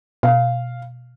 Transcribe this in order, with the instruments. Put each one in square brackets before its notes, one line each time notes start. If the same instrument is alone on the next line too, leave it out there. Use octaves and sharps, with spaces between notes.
[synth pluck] B2 [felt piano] F5